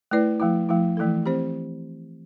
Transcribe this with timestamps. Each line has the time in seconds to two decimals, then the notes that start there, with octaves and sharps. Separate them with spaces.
0.11 A3 E4 B4 D5
0.40 F3 A3 E4
0.69 F3 A3 E4
0.97 E3 A3 E4 A4
1.26 C4 G4 C5